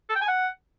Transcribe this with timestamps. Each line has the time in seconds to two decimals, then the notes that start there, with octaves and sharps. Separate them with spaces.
0.09 A4
0.15 G5
0.22 G#5
0.28 F#5